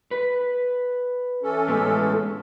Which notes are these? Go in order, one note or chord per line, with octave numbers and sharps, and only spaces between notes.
B4
E3 C#4 A4
A2 G#3 B3